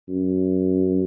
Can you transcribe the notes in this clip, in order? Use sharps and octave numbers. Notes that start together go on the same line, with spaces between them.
F#2